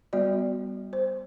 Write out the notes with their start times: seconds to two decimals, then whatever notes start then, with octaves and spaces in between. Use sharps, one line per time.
0.13 G3 B3 F#4 D5
0.93 C5